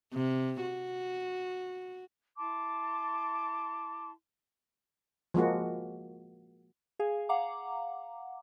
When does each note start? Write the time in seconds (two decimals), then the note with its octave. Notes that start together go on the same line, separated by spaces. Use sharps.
0.14 C3
0.62 F#4
2.36 E4 A5 C6 D6
5.34 F3 G#3 A#3 F#4
6.99 G#4 F5 G#5
7.29 F5 F#5 A#5 D6